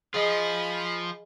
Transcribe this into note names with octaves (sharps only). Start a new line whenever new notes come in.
F3 F4 G#4 D#5 G#5 B5